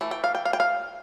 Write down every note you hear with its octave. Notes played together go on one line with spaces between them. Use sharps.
E3 A3
G5
F5
G5
F5
G5
F5